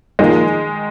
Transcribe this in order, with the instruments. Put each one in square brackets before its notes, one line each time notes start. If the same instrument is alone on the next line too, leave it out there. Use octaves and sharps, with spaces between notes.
[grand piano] A#2 F3 A#3 D#4 G#4 [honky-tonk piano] D#3 G#3